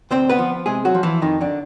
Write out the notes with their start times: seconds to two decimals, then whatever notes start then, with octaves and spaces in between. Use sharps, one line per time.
0.11 D2 C4 C5
0.29 B3 B4
0.39 F3
0.66 C3 G#3 G#4
0.85 F#3 F#4
0.95 F3
1.03 E3 E4
1.22 F2 D#3 D#4
1.41 D3 D4